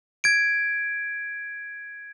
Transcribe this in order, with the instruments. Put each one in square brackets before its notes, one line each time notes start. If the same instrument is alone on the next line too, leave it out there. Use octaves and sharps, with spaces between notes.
[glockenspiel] G#6 D7